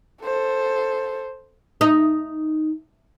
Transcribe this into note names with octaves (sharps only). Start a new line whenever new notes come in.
A4 C5
D#4